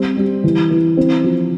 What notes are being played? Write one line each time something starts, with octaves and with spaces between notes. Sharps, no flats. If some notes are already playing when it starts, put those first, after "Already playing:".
Already playing: G3 C4
G3
E3
E3
C4
F3